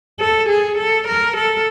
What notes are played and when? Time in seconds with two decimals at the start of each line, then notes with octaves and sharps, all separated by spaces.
0.21 A4
0.49 G#4
0.77 A4
1.07 A#4
1.36 A4